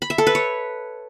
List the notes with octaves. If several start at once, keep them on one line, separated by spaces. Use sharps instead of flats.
B5
E5
A4
B4
C#5